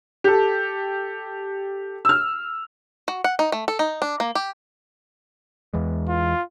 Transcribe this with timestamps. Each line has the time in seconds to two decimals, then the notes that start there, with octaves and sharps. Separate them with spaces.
0.24 G4 A4
2.05 E6 F6
3.08 F#4
3.24 F#5
3.39 D#4
3.52 A3
3.68 A4
3.79 D#4
4.02 D4
4.20 A#3
4.35 G4
5.74 E2 E3 G#3
6.08 F4